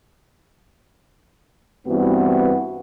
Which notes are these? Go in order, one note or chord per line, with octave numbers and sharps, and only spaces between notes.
G2 E3 B3 C4 F#4